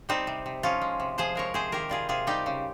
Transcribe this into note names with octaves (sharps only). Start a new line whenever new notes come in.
G3 C4 D#4
C3
C3
F3 C#4 F4
G#3
C3
F3 G#4 C5
G#3 A#4 C#5
C3 G#4 C5
D#3 G4 A#4
G3 F4 G#4
C3 F4 G#4
G3 D#4 G4
C#3